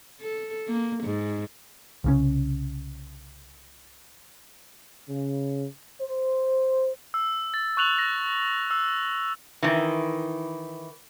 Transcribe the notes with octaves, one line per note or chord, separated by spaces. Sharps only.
A4
A#3
G#2
C2 C#3 C#4
C#3
C5
E6
A6
C#6 F#6 F7 F#7
A#6
E6
D#3 E3